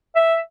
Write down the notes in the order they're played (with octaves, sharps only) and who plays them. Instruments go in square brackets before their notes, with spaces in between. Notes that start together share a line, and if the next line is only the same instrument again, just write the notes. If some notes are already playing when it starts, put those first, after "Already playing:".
[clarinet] E5